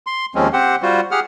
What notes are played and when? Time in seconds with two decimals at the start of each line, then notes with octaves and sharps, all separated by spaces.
0.07 C6
0.35 D#2 F3 G#3 C4 C#4
0.53 C4 G4 C5 F#5
0.82 G3 F4 F#4 C5
1.11 G4 G#4 F#5 F6